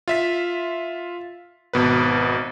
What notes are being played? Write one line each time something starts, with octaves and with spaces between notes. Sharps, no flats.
F4 E5 B6
G#1 B2 B4